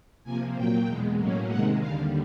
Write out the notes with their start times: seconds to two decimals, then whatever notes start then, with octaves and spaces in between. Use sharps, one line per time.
0.24 C3 F3 A#3 G#5
0.55 A#2 F#3 A#3 G5
0.86 E2 B2 G#3
1.17 A2 F#3 A#3 C#4
1.48 C3 D#3 G#3 F#5
1.79 D#2 D3 G3 F5